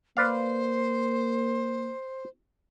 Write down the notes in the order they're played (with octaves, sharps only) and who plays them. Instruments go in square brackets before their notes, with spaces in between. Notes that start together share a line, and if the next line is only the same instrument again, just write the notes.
[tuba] A#3 [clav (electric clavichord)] B4 D5 F5 [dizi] C5